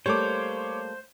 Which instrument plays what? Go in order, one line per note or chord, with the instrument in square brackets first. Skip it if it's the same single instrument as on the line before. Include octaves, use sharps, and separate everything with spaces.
[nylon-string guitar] G3 A3 A#3 [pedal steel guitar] C5 [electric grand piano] C#5 D6